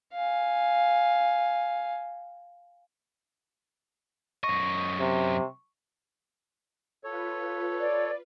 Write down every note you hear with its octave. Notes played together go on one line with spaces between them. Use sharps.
F5 G#5
F#2 D#5 C#6
C3
F4 A4 B4 C#5
D5